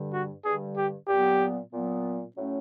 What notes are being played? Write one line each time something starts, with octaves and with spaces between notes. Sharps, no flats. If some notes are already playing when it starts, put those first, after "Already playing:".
Already playing: G2 D3 G3
F#4
G2 D3 G3 G#4
G4
A#2 F#3 B3 G4
A#2 F#3 B3
A2 F#3 A3 C#4